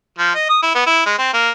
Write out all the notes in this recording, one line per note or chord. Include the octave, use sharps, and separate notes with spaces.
F3
D#5
D#6
E4
B3
E4
G#3
C4
A#3